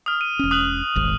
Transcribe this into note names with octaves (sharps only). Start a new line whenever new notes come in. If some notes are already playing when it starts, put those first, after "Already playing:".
D#6 F6
D#7
E1 C#4
D#6 F#6 F#7
D#1 G#1 G#2